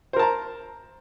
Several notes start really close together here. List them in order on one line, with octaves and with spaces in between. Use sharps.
C5 A#4 A5 A#5